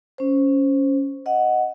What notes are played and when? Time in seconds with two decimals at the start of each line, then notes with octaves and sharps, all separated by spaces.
0.18 C#4 C5
1.26 D#5 F#5